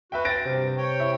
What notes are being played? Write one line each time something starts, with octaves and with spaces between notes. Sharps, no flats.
F#4 B4 E5 G5
A6 A#6 D7
G2 C3 F6 G6
C#5 G5
E4